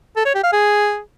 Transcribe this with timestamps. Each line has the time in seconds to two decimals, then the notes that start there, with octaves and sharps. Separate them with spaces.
0.16 A4
0.25 C#5
0.34 G4
0.43 F5
0.52 G#4